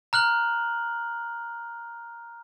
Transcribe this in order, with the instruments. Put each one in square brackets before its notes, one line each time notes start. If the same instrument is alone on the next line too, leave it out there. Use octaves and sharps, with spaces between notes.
[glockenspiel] A#5 F6 F#6 F#7